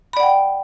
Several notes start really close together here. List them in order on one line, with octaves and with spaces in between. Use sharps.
B5 D5 F#5 G5